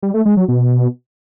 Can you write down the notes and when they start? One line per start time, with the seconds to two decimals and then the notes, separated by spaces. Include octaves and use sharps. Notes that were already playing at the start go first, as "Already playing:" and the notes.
0.03 G3
0.14 A3
0.25 G#3
0.37 F#3
0.48 B2